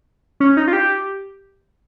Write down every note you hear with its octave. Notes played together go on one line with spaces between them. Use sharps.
C#4
D#4
F4
G4